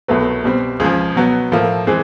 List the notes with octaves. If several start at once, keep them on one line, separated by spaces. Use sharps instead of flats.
C2 B2 F#3 A3 B4
B2 G3 C4
C#2 C#3 F3 G#4
B2 F#3 B3
A2 F3 A#3 A4
E3 G#3 C4 G#4